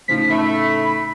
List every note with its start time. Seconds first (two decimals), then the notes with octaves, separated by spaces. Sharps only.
0.08 A2 C#3 F3 D#4 B6
0.30 A3 B5